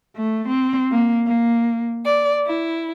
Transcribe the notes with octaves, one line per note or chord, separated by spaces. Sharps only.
A3
C4
A#3
A#3
D5
E4